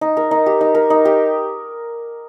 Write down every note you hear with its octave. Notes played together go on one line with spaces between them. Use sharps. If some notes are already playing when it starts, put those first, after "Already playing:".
D#4
A#4
D#4
G4
D#4
A#4
D#4
G4